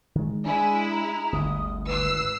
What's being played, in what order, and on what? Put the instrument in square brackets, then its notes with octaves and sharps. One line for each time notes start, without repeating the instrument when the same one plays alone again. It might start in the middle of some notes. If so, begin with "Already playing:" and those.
[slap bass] D#3 G#3
[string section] G#3 E4 [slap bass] D4 [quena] G#5
[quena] A#5
[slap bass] G1 D2 [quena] D#6
[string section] G#1 E6 C7 [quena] B4